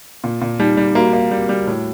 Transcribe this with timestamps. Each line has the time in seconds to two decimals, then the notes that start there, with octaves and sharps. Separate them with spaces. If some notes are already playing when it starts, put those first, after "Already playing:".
0.24 A#2
0.41 A#2
0.60 G3 D#4
0.77 G3
0.95 A#3 F#4
1.13 A#3
1.31 G3
1.49 G3
1.67 A2